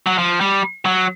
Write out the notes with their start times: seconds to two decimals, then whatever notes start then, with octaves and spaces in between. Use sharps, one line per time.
0.06 F#3
0.18 F3
0.41 G3
0.85 F#3